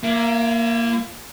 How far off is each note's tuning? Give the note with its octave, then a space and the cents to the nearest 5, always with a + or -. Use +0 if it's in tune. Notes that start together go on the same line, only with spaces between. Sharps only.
A#3 +0 E4 +40